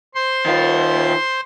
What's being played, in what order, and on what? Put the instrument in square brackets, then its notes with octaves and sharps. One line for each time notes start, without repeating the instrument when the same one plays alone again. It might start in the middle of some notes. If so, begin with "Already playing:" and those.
[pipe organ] C5 C6
[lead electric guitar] D#3 F4